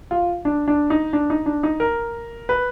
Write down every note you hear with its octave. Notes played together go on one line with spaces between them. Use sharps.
F4
D4
D4
D#4
D4
D#4
D4
D#4
A#4
B4